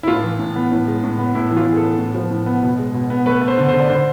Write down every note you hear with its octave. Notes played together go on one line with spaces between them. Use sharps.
E4
A2 F4
E3
A2
B3
A2
G#3
A2
B3
A2 E4
E3
F4
A2
G#4
A4
B3
A2
F3
A2
B3
B2
G#3
B2
B3
A3 B4
A3
C5
D3
D3 C5
D5
D3 C5